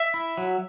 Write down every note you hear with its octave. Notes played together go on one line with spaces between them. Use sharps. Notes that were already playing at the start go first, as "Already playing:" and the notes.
Already playing: E5
E4
F#3